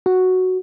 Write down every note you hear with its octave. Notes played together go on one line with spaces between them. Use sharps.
F#4